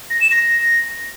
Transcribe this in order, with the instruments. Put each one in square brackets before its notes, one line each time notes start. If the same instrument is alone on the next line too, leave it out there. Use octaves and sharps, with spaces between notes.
[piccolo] A#6
E7
A#6